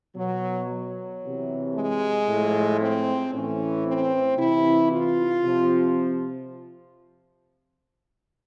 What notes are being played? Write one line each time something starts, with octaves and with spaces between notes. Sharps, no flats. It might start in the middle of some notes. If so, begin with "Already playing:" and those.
B2 F#3
F#3
C3 E3
G#3
A2 F3
C4
A2 E3 C#4
C4
C3 E3 E4
F4
C3 F3